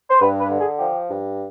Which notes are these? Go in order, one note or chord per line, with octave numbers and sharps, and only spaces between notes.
C5
G2 B4
B4
D3
G#4
F3 G4
G2